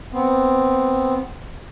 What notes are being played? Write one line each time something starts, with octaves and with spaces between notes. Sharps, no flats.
B3 C4